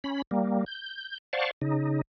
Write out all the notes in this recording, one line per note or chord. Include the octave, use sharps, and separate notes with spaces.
C#4 B5
G3 A#3
G6
C5 D5 F5 F#5 A5 C#6
C#3 D#4